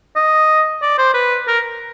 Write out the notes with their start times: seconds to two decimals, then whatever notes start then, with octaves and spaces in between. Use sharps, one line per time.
0.16 D#5
0.82 D5
0.98 C5
1.14 B4
1.47 A#4